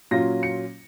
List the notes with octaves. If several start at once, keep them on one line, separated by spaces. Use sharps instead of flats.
A#2 F#3 C#4 F4 A#6
C#7